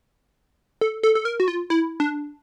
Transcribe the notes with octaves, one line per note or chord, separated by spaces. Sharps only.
A4
A4
A4
A#4
F#4
F4
E4
D4